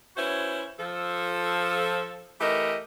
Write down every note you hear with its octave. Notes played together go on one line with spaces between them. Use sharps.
C#4 E4 F#4 B4 C5
F3 A4
E3 A3 G4 A#4 D#5